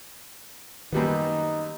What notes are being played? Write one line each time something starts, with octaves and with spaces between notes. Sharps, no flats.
F#2 D#3 G3 A#3 B3 D#4